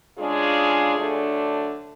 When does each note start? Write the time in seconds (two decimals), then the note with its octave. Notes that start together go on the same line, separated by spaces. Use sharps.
0.17 C#3 G#3 D4 F4 G#4
0.97 D3 F#3 A3 D4